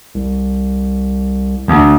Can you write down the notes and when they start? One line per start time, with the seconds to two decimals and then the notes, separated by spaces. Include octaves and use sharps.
0.15 C2
1.68 D2